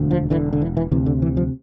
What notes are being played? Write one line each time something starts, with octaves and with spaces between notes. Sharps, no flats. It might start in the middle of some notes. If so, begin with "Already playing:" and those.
Already playing: E1 D2 D3
F3
E1 D2 D3 E3
D3
E3
E3
D2 C3 E3
D3
E3
F3